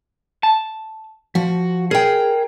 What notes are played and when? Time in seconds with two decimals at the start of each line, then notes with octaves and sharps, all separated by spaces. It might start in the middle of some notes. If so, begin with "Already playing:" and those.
0.43 A5
1.35 F3 F#4
1.91 G#4 A#4 G5